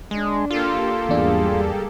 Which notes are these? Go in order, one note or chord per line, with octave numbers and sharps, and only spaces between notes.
G#3 D4
A#3 F4 G4 A4
E2 G#2 G3 D4 G#4